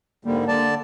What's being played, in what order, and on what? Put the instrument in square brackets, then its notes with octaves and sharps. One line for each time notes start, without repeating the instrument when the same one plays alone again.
[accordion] G#2 D3 G3 [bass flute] A#3
[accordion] D3 D5 A5